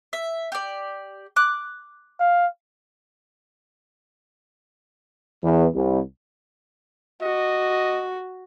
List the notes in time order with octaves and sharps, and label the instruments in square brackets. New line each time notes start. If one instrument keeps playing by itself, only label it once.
[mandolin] E5
G4 D5
D6 F#6
[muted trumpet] F5
[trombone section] E2
C2
[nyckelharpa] F#4 [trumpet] D#5